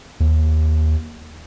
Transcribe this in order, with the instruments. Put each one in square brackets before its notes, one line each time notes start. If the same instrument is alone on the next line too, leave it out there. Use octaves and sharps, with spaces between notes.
[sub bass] D#2